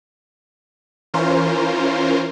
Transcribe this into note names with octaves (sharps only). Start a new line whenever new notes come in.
E3 C#4 F4 A#4 C5